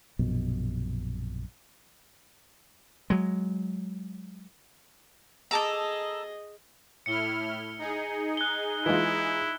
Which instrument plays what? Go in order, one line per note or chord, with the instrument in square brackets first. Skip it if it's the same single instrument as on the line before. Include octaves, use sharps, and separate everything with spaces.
[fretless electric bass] A#1 F#2 B2
[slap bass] F#3 G#3
[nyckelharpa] G#4 D#5 [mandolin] A4 A#5 [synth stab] A5 D6 E6
[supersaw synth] A2 E4 F6 [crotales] C#7 G7
[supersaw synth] D#4 G#4
[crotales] F#6 G7
[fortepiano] E3 G#3 F4 [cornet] E4